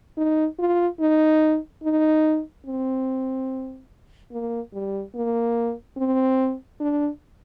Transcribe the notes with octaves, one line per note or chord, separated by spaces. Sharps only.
D#4
F4
D#4
D#4
C4
A#3
G3
A#3
C4
D4